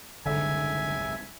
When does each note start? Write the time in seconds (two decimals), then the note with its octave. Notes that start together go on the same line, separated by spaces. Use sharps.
0.26 F#1 C2 G#2 D3 E5 G#5